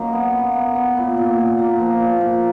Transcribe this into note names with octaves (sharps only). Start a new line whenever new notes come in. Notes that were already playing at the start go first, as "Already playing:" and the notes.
Already playing: F#2 A#3 D#4
B3
F4
B3
B3
A#2
A#2
A#2
A#3
F3
A#2
A#2